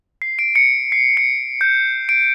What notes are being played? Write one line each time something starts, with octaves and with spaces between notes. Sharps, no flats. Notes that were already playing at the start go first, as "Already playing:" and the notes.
C7
D7
C#7
C7
C#7
G6
D7